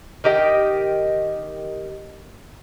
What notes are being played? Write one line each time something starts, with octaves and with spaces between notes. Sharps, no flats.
D#3 G4 D#5 G5